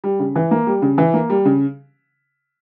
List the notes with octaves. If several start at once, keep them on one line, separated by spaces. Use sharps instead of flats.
G3
C#3
E3
A#3
G3
C#3
E3
A#3
G3
C#3